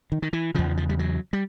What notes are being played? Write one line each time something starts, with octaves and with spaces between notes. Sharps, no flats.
D#3
D#3
E3
E2 C#3 F3
F3
G3
F#3
G3